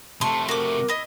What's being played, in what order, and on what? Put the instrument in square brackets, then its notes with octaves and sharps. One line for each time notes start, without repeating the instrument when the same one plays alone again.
[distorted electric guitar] C3 A3 [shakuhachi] A5 [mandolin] C6 C#6
[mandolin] F#4 D6 [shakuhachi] A#4
[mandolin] E4 D#5